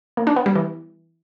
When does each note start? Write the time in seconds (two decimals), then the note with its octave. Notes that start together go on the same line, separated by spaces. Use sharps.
0.17 A#3
0.27 D4
0.36 B3
0.46 G3
0.55 E3